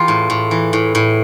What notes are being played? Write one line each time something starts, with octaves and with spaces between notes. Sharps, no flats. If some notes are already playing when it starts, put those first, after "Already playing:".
Already playing: E2 F4 G4
A2
A2
E3
A2
A2